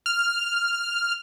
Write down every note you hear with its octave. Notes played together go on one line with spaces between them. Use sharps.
F6